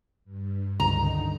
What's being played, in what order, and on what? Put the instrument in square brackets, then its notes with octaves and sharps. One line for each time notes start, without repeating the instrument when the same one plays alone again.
[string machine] G2
[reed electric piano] C#2 G2 [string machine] D3 D#3 D#4 [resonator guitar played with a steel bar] A#5